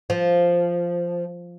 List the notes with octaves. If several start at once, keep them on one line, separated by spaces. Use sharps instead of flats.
F3